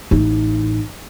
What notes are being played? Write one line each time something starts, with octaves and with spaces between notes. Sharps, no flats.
A1 D#4